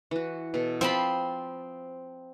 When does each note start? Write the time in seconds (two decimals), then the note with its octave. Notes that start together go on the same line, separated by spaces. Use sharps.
0.11 E3 F#4
0.54 B2 A4
0.81 F3 C4 A5 B5